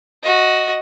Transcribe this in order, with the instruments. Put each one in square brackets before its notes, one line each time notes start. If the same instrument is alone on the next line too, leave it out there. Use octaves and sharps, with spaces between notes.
[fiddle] F#4 D#5